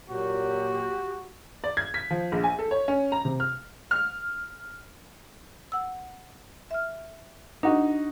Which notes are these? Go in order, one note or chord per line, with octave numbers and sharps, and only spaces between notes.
A#2 F#3 F#4 G4
D5
G#6
B6
F3
A#1
G#5
A4
C#5
C#4
A#5
C3
F6
F6
F#5 E6
E5 F6
D4 D#4 F#4